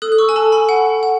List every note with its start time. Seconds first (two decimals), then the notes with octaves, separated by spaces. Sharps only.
0.02 A4 D#6 F#6
0.12 F#6
0.18 C#6 E6
0.29 G#5
0.36 A4 A5
0.52 G#5 B5
0.69 F#5
1.03 F#5